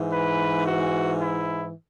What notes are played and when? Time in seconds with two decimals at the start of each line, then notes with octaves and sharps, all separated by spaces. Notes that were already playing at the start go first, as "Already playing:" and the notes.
Already playing: G#2 E3
0.12 B4
0.65 F#4
1.19 E4